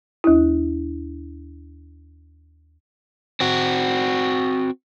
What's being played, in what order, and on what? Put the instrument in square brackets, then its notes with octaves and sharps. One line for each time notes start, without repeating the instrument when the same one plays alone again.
[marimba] D#2 E4
[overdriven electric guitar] C4 F#4